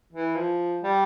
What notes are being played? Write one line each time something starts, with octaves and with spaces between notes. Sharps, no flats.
E3
F3
G3